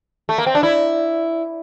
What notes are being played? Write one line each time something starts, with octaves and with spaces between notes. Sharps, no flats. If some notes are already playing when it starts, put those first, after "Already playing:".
A3
A#3
C4
D4
E4